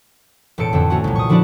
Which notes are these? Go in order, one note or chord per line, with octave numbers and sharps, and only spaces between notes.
E1 A2 A4 C#7 D7
F2 D3 C4
A3 C#4 F#4
C2 A#2
C#6 D#6
D3 F3 D4 E4 F#4 D5